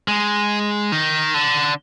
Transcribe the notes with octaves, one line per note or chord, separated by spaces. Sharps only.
G#3
D#3
D3